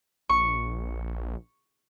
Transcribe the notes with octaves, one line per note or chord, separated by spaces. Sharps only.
A#1 C#6